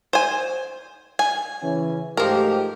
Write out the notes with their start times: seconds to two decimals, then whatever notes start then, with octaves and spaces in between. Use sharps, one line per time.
0.13 C5 G#5
1.19 G#5
1.62 C#3 E3 C#4
2.17 G#2 F3 A3 G4 A#4